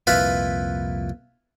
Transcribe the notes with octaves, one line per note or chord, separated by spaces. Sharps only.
C2 F2 A#2 E4 F4 B4